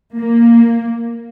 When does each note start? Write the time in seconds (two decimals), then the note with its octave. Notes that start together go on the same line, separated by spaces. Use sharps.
0.15 A#3